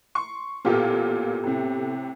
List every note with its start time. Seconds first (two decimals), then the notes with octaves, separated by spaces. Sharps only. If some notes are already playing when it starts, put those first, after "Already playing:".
0.15 C6 C#6
0.65 A1 A#2 B3 F4 G4 A4
1.44 A2 C3